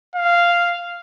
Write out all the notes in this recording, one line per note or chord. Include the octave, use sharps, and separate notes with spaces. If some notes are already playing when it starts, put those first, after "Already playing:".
F5